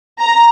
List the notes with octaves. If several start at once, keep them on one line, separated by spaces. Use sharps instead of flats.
A#5